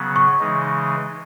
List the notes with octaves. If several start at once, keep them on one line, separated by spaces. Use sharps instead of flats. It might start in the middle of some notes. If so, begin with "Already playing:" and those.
Already playing: C#3 F#3 B3
C#6
C#3 E3 G#3 D#4